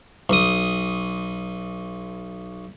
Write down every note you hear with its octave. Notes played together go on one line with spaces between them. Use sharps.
B1 D#6